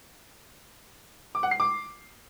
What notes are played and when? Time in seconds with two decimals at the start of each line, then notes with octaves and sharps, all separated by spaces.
1.35 D6
1.43 F#5
1.51 C7
1.60 D6